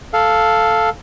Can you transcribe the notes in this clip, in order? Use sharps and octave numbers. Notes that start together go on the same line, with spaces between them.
A4 F5